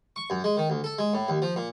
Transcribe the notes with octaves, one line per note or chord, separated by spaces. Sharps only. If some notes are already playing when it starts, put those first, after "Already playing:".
C#6
F#2
G#3
D#3
D2
A4
G#3
A2
D#2
F3
A#2